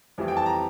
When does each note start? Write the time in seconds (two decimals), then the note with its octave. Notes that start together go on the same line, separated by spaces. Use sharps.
0.18 F2 E3 G3
0.28 G5
0.37 A5
0.46 A#5